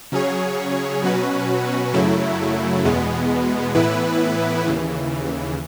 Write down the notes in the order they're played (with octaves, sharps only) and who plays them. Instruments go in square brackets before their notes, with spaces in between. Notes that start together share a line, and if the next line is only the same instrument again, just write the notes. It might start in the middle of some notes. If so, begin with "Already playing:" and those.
[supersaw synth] C#3 F#3 C#4 G#4 C#5
B2 F#3 C#4 F#4 B4
F#2 C#3 F#3 A3 E4
E2 B2 G#3 B3
A2 E3 B3 E4 B4
D#2 C#3 E3